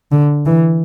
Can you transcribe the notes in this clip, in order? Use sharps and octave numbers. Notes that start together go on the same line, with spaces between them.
D3
E3